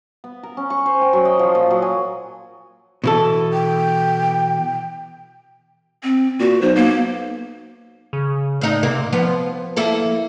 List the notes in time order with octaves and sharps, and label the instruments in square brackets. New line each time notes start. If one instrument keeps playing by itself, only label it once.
[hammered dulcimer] B3
A#4
C#4
C#6
C5
G5
F#3
D#5
F3
A#2
F#3
G#5
[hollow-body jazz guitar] B2 E3 A4
[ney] G5
[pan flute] C4
[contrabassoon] A#2 [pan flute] F#4
[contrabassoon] B1 [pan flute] C5
[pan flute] A#3
[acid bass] C#3
[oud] A2 D#4
[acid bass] C3 [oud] A#3
[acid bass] F3 [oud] B3
[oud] A#3 E4 A4